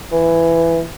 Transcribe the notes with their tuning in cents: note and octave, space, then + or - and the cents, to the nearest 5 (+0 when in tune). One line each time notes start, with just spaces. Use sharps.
E3 +10